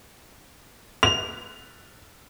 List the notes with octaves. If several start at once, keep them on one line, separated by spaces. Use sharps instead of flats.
F7